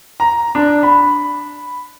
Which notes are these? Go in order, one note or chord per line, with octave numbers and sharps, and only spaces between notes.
A#5
D4
B5